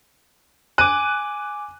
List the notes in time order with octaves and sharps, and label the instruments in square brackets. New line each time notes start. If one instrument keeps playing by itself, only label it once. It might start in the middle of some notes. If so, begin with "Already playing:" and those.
[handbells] G#5 D6 [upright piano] F#6 D#7